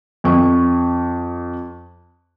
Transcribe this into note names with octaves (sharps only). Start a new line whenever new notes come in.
F2 C#6